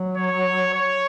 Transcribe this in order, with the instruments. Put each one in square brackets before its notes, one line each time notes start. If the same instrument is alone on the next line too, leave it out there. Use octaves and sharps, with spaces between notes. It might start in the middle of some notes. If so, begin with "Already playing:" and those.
Already playing: [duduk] F#3
[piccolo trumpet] C#5
C#5